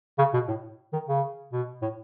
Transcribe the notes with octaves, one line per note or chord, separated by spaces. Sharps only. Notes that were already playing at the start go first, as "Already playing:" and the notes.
C#3
B2
A2
D#3
C#3
B2
A2